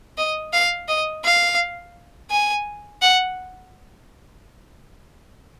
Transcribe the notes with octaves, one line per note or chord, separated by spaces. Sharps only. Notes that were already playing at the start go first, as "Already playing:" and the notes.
D#5
F5
D#5
F5
G#5
F#5